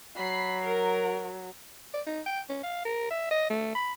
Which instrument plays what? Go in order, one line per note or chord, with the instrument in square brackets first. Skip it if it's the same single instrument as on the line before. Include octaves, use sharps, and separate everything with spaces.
[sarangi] F#3 [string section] B5 C7
[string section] A#4
[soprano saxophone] D5
D#4
G5
C#4
F5
A#4
E5
D#5
A3
B5